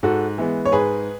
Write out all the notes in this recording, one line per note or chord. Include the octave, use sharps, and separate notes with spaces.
G#2 F#4 A4
E3 G#3 B3
C#5
G#2 G#4 B4